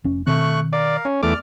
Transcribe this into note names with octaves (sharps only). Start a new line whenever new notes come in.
F1 C#4
B2 D#3 A3 C4 C#6 F#6
A#4 D5 F5
C#4
E2 A3 D5 D6 F6